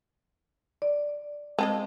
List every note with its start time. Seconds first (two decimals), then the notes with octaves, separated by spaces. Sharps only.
0.82 D5
1.59 G#3 C4 F4 D#5 A5